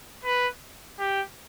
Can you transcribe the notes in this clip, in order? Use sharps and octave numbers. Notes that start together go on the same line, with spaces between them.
B4
G4